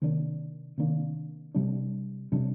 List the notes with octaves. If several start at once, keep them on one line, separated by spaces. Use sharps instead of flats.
C3 D#3 A#3 D4
C3 D#3 A#3 D4
C3 G3 D4
C3 G3 D4